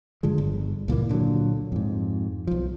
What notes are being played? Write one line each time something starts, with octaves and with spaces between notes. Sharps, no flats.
G2 D3 F3 G#3
G1
C#2 A#2 E3 A#3
A#2 D3 E3 F#3
F2 G#2
B1 F3